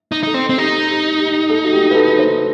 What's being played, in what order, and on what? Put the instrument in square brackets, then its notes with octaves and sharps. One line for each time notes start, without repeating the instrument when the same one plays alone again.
[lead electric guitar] D#4
[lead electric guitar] D#4 [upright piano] A4
[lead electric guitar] C4
C4
[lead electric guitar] D#4 [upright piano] G4
[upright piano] G4
G4
A4
F#4
G4
B4
A4
C5